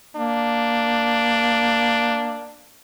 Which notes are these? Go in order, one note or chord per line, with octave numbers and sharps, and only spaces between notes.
A#3 D4